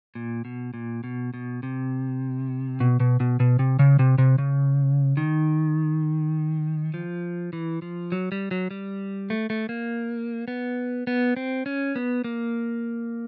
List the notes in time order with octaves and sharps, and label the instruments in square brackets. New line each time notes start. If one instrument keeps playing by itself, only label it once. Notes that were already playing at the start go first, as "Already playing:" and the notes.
[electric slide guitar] A#2
B2
A#2
B2
B2
C3
B2
B2
B2
B2
C3
C#3
C3
C3
C#3
D#3
F3
E3
F3
F#3
G3
F#3
G3
A3
A3
A#3
B3
B3
C4
C#4
B3
A#3